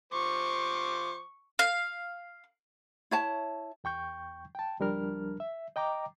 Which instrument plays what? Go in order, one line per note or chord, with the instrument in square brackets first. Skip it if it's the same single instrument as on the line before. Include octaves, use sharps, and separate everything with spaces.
[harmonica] F3 C5 D6 [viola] C#6
[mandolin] F5
[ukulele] E4 C#5 A5
[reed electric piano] E2 G5 C#6 G6
G5 A5
C#2 F3 G3 D4 A#4 F6
E5
D#5 G5 A#5 D6